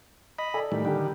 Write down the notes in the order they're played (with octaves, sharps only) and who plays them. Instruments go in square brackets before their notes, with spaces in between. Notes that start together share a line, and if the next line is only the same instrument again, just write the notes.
[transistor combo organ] D#5 B5
[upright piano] A4 D5 G#5
[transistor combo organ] A2 D#3 G3
[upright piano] D3 G3 [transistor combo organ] D#3 G4